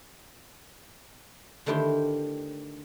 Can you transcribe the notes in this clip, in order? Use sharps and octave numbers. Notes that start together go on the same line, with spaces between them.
D3 D#3 A3 E4 G4 C5